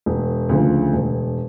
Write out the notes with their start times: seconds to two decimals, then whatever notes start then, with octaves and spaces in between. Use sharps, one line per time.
0.06 E1
0.49 D2 C#3 F3
0.93 E1